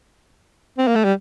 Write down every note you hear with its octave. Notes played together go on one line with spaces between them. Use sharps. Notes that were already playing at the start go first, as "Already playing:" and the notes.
C4
A#3
A3
G3